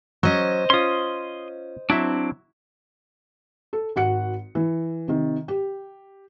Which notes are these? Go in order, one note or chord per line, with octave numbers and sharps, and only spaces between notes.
F#3 C#4 C5 D#5
C#4 F4 C6 D#6
F#3 C4 D4 E4 E5
A4
G#1 F#4 F#5 C#7
E3
C3 D#3
G4